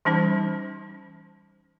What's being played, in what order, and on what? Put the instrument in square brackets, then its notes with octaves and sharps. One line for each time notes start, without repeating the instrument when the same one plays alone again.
[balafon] E3 G3 C#4 D#4 C5